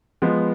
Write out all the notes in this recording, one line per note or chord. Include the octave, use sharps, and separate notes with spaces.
F3 G#3 B3